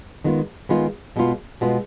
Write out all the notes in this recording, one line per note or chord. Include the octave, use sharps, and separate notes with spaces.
D#3 G#3 B3 F4
D#3 G#3 B3 F4
B2 G#3 B3 F4
B2 G#3 B3 F4